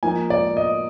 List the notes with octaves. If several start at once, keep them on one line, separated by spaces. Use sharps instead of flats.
F3 A#3 D#4 G#5
D5
D#5